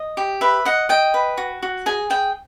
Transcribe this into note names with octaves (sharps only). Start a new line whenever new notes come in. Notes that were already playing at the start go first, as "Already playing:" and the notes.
Already playing: D#5
G4
B4 E5
D#5 F#5
D#5 G5
B4
F#4
F#4
G#4 G#5
G#4 G5